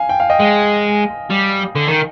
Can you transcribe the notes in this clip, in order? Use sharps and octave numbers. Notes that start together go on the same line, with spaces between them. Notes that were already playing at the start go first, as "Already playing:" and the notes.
Already playing: F5 G#5
G5
F5
D#5 G5
G#3
G3
D3
D#3